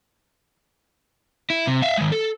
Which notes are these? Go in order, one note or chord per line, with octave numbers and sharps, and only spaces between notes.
E4
C3
E5 F5
D#3 G#3
A4